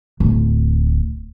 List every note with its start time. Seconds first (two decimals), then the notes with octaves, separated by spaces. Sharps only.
0.20 D1